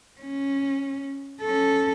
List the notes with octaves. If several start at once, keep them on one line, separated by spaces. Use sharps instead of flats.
C#4
C#4 A4